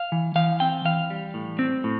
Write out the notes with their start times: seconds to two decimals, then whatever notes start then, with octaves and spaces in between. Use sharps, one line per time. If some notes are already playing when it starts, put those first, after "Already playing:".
Already playing: F5
0.12 E3
0.35 E3 F5
0.60 C4 G5
0.85 E3 F5
1.10 G3
1.34 A2
1.59 C4
1.84 A2